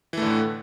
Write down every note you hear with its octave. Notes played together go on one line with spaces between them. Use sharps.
A2 D3 E3 A3